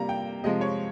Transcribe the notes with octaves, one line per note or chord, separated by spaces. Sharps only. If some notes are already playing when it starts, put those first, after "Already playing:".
Already playing: C3 G3 A#3 A#5
G5
C3 F3 G#3 D#5
C#5